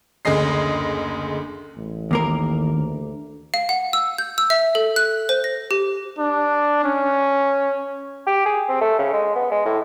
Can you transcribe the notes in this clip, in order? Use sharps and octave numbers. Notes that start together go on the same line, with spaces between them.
F#1 D2 G#4 D#5 C7
A1
D#2 A#3 A#4
D2
F5
F#5
E6
G6
E6
E5
A4
F#6
C5
A#6
G4
D4
C#4
G4
G#4
C4
A3
C#3
G#3
B3
G#3
A2